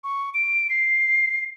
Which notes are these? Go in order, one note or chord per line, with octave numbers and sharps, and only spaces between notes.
C#6
D7
C7